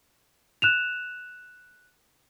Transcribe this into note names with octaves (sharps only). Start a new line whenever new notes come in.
F#6 E7 F7